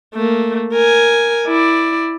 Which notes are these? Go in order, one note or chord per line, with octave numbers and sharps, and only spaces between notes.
A3 A#3
A#4 G#5
E4 D5